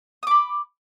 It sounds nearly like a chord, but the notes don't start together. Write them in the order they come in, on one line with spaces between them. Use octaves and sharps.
D#6 D6 B5